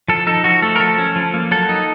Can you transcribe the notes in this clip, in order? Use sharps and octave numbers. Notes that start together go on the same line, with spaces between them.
F3 A4
D#4 A4
F3 F#4
A3 A4
A#4
F3 A4
C#4
F3
A#3
F#3 A4
D#4